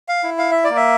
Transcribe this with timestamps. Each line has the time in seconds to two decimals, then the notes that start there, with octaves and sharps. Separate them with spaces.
0.08 F5
0.23 E4
0.38 F5
0.51 E5
0.64 D5
0.70 A#3
0.76 E5